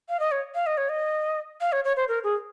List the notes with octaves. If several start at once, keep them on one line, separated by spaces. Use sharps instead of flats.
F5
D#5
C#5
F5
D#5
C#5
D#5
F5
C#5
C#5
C5
A#4
G#4